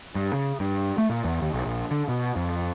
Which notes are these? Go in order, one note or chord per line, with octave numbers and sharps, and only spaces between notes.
G2
C#3
G2
A3
A#2
E2
D#2
B1
A#1
D3
B2
F2